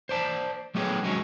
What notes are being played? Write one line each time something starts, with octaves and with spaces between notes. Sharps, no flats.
C5 D5 A5
F#3 A3 B3 G4 G#4 C#5
C2 F#3 G#3 C#4 D#4 C#5